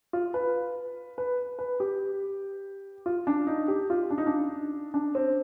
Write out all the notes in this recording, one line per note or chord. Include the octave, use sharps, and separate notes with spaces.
F4
B4
B4
B4
G4
F4
D4
D#4
G4
F4
D4
D#4
D4
D4
C4